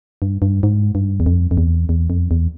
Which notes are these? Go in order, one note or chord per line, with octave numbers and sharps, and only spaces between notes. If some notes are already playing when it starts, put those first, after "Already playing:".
G2
G2
G#2
G2
E2
F2
F2
E2
E2
F2
E2